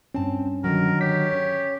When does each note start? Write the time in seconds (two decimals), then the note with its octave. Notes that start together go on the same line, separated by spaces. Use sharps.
0.15 G2 C4 C#4 A5
0.64 D3 D#3 F#3 A#4
1.01 G4 C#5 B6
1.33 C#4